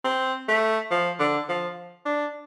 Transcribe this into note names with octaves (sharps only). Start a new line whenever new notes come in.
C4
A3
F3
D3
F3
D4